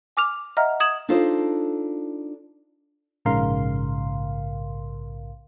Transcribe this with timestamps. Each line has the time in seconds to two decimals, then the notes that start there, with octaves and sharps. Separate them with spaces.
0.17 G#5 D6 F6 F7
0.57 D#5 E5 F#5 A#5 F6
0.80 D#6 G#6 E7 F#7
1.09 D4 D#4 F4 A4 C5
3.25 A#1 G#2 C#3 A#4 F5 C6